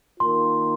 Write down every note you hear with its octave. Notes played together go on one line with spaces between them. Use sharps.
D#3 A#3 F4 C6